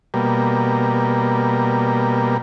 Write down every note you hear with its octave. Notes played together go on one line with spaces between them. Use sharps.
B2 G3 A#3